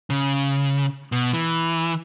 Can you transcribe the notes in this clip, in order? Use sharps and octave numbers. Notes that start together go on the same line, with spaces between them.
C#3
B2
E3